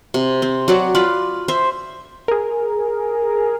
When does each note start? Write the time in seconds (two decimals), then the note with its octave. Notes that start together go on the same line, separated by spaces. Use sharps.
0.14 C3
0.42 C4
0.68 F#3 F#4 D5
0.95 F4 B4 D5
1.48 C5 E5
2.28 G#4 A#4